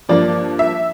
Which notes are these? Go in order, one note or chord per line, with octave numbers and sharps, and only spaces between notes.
G2 F3 A#3 D5
E5